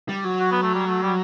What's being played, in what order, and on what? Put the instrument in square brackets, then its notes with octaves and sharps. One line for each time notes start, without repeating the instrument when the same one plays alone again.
[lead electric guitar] G3
F#3
[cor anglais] F#4
B3
A3
G3
A3
G3